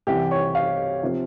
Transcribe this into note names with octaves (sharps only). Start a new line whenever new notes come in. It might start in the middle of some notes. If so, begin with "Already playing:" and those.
C2 C3 E3 G4
C#5
F5
C3 F3